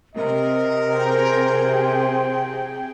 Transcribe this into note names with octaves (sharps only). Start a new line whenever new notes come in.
C3 A#4 D#5
G#4 C5 G5